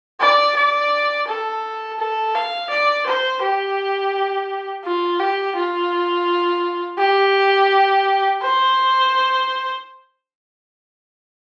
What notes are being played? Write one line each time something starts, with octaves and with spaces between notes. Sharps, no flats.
D5
D5
A4
A4
F5
D5
C5
G4
F4
G4
F4
G4
C5